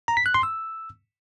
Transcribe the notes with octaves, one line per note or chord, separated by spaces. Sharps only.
A#5
B6
F#6
C6
E6